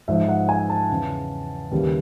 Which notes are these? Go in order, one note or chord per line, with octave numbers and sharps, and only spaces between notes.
G#2 F3 E5
F#5
G#5
A5
E2 C#3 E3
D#2 C#3 E3 G3